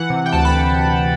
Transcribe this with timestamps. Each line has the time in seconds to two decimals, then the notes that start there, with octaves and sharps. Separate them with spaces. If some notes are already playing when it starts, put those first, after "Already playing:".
Already playing: E3 F#5
0.10 C3
0.26 G5
0.32 D2 A5
0.45 B5